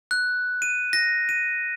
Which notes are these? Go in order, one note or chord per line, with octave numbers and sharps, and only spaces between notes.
F#6
D#7
A#6
D#7